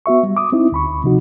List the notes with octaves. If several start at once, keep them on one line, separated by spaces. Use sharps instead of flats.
B3 F#4 E5 C#6
G3
D6 D#6
C4 D#4 E4
D2 B5 C#6
C3 F3 D#4 F#4